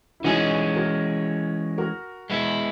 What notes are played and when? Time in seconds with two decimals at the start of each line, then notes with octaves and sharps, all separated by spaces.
0.20 E4
0.24 E3 G#3 C#4 D#4 F#4 G#4
0.75 F#4 A#4
1.78 F#4 A#4
2.30 G#3 B3 E4